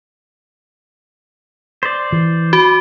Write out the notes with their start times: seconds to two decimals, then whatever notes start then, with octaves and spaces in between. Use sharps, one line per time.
1.83 C5 D5
2.12 E3
2.53 F#4